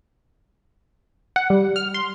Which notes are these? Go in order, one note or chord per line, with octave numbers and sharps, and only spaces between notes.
F#5
G3
F6
C6